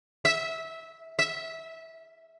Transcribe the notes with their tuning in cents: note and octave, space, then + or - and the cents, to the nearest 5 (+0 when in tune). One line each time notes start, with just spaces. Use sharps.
E5 -20
E5 -20